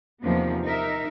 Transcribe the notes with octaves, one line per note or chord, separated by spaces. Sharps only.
E2 C3 D#3 F3 A#3 B3
D#4 A#4 E5